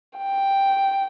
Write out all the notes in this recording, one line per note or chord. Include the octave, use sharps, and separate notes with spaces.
G5